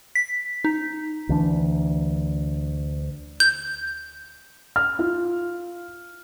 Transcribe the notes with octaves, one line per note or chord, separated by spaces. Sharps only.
B6
D#4
D2 E3 D4
G6
F6
F4